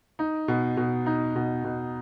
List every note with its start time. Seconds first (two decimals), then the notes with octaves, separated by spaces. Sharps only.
0.19 D#4
0.48 B2
0.77 B2
1.06 D#4
1.36 B2
1.64 B2